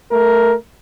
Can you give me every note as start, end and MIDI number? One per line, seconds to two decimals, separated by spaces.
0.10 0.54 57
0.10 0.54 70